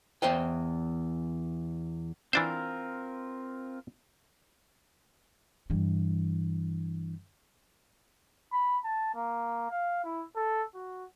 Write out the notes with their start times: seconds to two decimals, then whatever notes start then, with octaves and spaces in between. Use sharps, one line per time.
0.22 E2 C5 D#5 G5
2.33 E3 C4 D4 F4 A#4 C5
5.70 G2 E3
8.52 B5
8.84 A5
9.15 A#3
9.71 F5
10.05 E4
10.36 A4
10.74 F#4